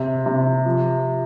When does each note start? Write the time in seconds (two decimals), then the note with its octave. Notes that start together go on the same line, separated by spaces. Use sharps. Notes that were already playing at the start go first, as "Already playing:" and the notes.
Already playing: C3
0.26 C3
0.66 F3